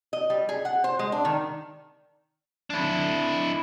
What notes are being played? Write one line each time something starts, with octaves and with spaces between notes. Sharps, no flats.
D#5
G3
G#4
F#5
C5
G#3
D4
D#3
D4 E4